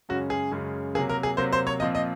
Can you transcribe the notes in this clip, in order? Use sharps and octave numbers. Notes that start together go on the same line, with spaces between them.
F#2 C#3 G#3 C#4 F#4
G#4
F#2 C#3 G#3 C#4
C3 F#3 A#3 G#4
A#4
G#4
C3 F#3 A#3 C5
C5
C#5
A#2 F3 C4 D#5
D#5